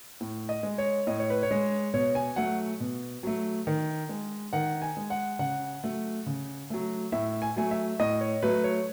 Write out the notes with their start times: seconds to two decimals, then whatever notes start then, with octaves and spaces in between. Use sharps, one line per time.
0.21 A2
0.49 D#5
0.63 G#3
0.78 C#5
1.07 A2 D#5
1.19 C#5
1.30 B4
1.43 C#5
1.51 G#3
1.94 B2 C#5
2.15 G#5
2.36 F#3 A3 F#5
2.80 B2
3.23 F#3 A3
3.67 D#3
4.09 G#3
4.53 D#3 F#5
4.82 G#5
4.97 G#3
5.10 F#5
5.39 C#3 F#5
5.84 F#3 A3
6.26 C#3
6.70 F#3 A3
7.12 A2 E5
7.42 G#5
7.56 F#3 A3 G#5
7.71 E5
7.99 A2 D#5
8.21 C#5
8.42 F#3 A3 B4
8.64 C#5